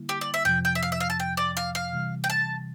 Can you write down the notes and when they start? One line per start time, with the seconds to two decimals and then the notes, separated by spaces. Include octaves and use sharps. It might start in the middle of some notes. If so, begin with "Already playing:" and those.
Already playing: D3 G3 A#3 E4
0.09 G4
0.21 D5
0.34 E5
0.45 F2 C3 F3 G5
0.65 G5
0.75 E5
0.83 F5
0.92 E5
1.00 F5
1.10 A5
1.20 G5
1.37 D5
1.57 F5
1.75 F5
1.93 C3 E3 G3
2.24 G5
2.30 A5